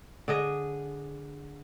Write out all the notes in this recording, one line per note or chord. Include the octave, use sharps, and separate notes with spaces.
D3 G#4 D#5